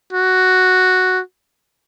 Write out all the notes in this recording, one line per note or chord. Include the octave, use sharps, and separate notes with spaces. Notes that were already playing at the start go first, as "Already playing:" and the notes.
F#4